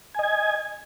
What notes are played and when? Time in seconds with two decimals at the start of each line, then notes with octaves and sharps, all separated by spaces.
0.15 G#5
0.19 D#5
0.23 G#6